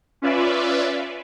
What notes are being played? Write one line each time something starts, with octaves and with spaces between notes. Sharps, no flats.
C#4 F4 B4 D5 E5